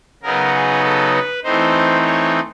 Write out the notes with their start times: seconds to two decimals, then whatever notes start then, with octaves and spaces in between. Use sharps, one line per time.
0.23 C#3 F#3 B3 D#4 A#4
0.54 G#4
0.84 A4
1.13 B4
1.43 E3 A3 C4 D#4 C5
2.05 C#5